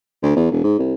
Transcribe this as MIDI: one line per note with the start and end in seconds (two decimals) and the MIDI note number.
0.23 0.35 38
0.37 0.48 40
0.51 0.62 28
0.64 0.77 44
0.79 0.94 36